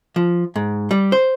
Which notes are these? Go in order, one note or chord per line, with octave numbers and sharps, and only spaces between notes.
F3
G#2
G3
C5